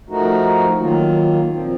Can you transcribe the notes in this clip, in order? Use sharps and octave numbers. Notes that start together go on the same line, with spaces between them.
F3 A3 D#4 F#4 A#4
D#3 F#3 A#3 F4
A#2 F3 C4